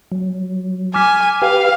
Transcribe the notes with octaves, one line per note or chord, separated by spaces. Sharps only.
F#3
G#5 D6 F6 B6
G4 B4 F5 G5